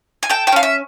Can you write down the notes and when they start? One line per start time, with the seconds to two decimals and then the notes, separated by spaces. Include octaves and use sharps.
0.23 G#5
0.29 A4 G5
0.47 G5
0.52 C#4 F5
0.63 E5